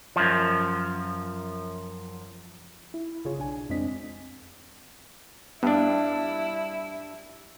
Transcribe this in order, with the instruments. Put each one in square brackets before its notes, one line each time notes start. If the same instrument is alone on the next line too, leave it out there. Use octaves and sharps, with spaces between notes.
[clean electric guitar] F#2 F3
[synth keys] E4
G1 C#3 F4 G#4 C#5
B1 D4 G#5
F2 G#3 C4 D4 D#5 B6
[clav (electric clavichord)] G2 D4 [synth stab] B3 [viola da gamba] E4